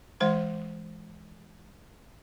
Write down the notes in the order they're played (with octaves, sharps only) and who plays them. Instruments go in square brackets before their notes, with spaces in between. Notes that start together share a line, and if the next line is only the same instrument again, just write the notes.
[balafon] E3 G#3 C5 F#5 C6